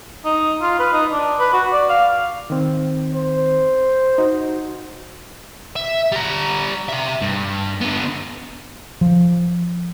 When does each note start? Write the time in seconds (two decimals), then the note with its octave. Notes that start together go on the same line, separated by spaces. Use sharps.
0.25 D#4
0.62 F4
0.79 B4
0.93 D#4
1.12 D4
1.39 B4
1.53 F#4
1.72 D5
1.89 F5
2.50 D#3 C4
3.13 C5
4.18 D#4 F#4
5.76 E5
6.12 G3 A#5
6.89 G4 E5
7.21 G2
7.81 D3 B3
9.01 F3